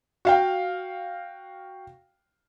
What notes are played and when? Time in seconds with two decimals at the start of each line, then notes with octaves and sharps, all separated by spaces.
0.25 F#4 F5 G5